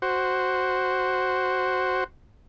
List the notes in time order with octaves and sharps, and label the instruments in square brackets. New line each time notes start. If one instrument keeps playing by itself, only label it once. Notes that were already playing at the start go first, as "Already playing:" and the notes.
[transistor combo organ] F#4 C5